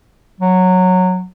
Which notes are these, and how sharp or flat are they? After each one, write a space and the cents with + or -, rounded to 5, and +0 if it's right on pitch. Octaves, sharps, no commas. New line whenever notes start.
F#3 -10